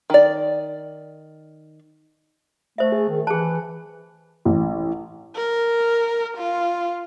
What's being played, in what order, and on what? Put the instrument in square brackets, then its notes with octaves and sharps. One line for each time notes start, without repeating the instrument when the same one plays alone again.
[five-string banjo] D#3 D5
[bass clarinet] A3 [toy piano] C5 E5
[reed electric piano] G#4
[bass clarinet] D#3
[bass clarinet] E3 [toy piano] G#4 A5 [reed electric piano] F#6
[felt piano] A1
[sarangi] A#4
F4